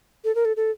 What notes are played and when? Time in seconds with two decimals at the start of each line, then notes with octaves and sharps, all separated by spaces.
0.24 A4
0.35 A#4
0.45 A4
0.56 A4